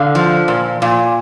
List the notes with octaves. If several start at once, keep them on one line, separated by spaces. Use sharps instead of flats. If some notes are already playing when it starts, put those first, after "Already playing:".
Already playing: D3 F5
F3
A#2
A#2